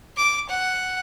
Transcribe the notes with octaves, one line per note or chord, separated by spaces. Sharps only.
D6
F#5